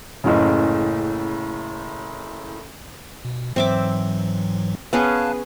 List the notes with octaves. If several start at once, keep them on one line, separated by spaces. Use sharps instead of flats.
F#1 A2 C#3
B2
G#2 E3 F#3 C4 E5 D6
B3 C#4 G#4 F5 A5 F#6